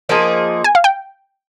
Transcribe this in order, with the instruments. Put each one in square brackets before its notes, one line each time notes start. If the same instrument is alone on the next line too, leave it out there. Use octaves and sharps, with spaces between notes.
[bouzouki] F3 A#3 D#4 G#4
[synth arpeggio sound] G#5
F5
G5